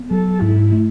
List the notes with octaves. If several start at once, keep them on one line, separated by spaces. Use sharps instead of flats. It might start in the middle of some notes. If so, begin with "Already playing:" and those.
Already playing: B3
F#3 A4
G#2 E4
A3